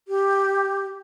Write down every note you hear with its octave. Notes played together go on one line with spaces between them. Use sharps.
G4